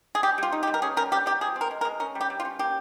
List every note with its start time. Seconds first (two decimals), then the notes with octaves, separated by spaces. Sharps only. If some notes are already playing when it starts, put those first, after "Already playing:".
0.15 G#4
0.23 G3 G4
0.38 G3 F4
0.52 D#4
0.63 G4
0.67 G3
0.74 A#4
0.82 C#4 G#4
0.97 G3 A#4
1.12 G3 G4
1.26 G3 G4
1.41 F3 G#4
1.56 C4
1.61 A#4
1.71 G#3
1.81 A#4
1.85 G#3
2.00 C#4 A#4
2.15 G3
2.21 G4
2.30 G3
2.40 F4
2.45 C#4
2.59 A#3 G4